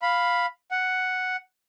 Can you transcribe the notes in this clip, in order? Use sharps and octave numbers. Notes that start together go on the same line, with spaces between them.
F5 B5
F#5